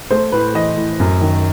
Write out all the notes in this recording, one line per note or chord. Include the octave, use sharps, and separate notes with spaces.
A3 C5
A2 B4
E3 D#5
A2
F#2
D#3